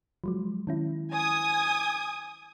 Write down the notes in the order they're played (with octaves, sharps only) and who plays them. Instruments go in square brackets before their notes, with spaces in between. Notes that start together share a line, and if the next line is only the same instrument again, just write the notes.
[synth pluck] F3 F#3 G#3
D#3 C#4 E4
[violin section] G#5 D#6 G#6